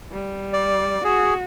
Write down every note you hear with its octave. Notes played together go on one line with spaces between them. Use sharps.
G3
D5
F#4 G#4